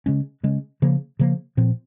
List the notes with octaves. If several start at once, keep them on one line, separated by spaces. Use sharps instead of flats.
C#3 G#3 C#4
C#3 G#3 C#4
C#3 F3 A#3
C#3 F3 A#3
A#2 F3 C4